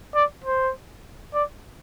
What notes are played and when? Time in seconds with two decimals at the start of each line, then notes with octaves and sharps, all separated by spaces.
0.15 D5
0.44 C5
1.34 D5